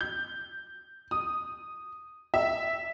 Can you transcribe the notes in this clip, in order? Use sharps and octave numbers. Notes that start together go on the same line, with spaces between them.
G6
D#6
E5